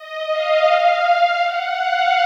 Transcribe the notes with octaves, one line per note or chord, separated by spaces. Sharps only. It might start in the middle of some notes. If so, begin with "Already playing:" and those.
Already playing: D#5
F5
F5
F#5
F5